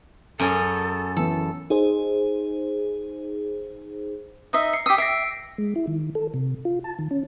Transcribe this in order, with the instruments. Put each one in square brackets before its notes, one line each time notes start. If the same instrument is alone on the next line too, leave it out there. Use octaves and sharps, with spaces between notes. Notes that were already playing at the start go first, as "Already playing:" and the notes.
[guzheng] F#2 C#4 G#4 [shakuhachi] A4
[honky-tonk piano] E3 B3 [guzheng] A4
[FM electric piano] D#4 G#4 C5
[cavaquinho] D#4 D#5 E5
[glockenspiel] C7 C#7
[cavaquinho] G4 D#6 [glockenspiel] E6 B6
[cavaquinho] E5 [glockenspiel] A#6 C7 D7
[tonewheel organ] G#3
E4
D#3
A4
C3
F4
A5
D#3
C#4